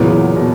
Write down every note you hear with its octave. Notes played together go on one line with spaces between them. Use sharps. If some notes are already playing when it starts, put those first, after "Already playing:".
Already playing: E2 A#2 C#3 F#3 B3 E4
B2